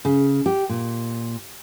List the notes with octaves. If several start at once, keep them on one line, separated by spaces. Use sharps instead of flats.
C#3
G4
A#2